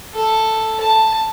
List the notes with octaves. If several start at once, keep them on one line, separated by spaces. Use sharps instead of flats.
A4
A5